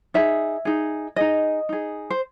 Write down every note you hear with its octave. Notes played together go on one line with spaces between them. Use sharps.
D#4 G#4 E5
D#4 G#4
D#4 G#4 D#5
D#4 G#4
C5